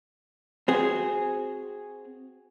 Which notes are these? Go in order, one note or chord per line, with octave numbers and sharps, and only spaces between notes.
C4 F#4 G#4